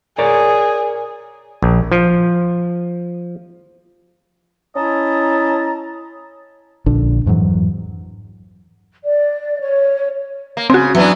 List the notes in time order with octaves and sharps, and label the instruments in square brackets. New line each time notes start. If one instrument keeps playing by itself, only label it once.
[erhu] G#4 [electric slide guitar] A#4 C#5 D5
[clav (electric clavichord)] A#1
F3
[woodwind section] C#4 E4 D#5 A5 A#5
[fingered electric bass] A#1 A#2 D3 D4
F2 G#2 E3 F#3
[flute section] D5
C#5
[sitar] A#3
[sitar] C#3 [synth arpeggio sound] C4 F#4
[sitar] E3 B3 D4 [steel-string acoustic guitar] F#3